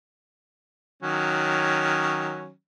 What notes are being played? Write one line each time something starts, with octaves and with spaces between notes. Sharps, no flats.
D#3 F#3 C#4